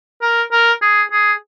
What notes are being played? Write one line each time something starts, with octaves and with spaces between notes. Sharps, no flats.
A#4
A#4
G#4
G#4